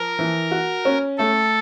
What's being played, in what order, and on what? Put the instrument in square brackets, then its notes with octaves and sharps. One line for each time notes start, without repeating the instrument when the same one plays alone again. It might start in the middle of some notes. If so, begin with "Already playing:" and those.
Already playing: [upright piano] F3 [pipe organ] A#4
[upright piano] E3
F#4
C#4
[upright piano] A3 [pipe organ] A4